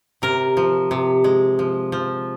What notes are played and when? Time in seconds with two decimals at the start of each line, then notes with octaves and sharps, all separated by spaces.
0.22 C3 A#4
0.57 F3
0.91 C3
1.24 G#3
1.59 F3
1.92 F3